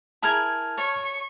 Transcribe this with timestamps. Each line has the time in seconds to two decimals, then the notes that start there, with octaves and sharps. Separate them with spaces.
0.23 E4 G#4 A#4 A5 F6 G#6
0.77 C#5 C#6